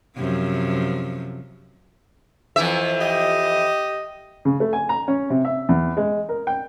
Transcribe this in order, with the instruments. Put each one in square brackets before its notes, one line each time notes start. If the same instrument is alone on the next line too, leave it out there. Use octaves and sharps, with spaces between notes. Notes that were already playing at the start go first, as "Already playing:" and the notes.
[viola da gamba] F#2 C3 F3
[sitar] F2 E3 E5
[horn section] G4 D#5
[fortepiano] C#3
A3
G#5
A#5
C#4
C3
E5
E2
G#3
A#4
G5